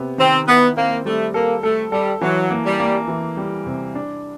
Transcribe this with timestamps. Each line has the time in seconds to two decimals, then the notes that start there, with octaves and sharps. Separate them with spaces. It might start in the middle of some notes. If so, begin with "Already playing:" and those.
Already playing: C3 B3
0.18 D#3 C4
0.47 B3 E4
0.77 A#3 C4
1.05 G3 A3
1.34 A#3 A4
1.63 A3 A4
1.92 G3 A4
2.21 E3 F#3
2.51 A#3
2.65 G3
2.80 A#3
3.08 E3
3.37 G3
3.66 C3
3.95 D4